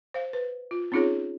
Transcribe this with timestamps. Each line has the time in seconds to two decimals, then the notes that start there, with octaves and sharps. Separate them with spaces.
0.14 C5 F5
0.33 B4
0.71 F4
0.92 C4 C#4 D#4 F4 G#4 C#5